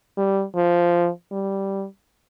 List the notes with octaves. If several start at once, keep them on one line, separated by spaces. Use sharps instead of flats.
G3
F3
G3